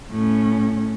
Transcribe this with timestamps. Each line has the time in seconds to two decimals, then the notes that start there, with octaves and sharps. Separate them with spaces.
0.11 A2 C#4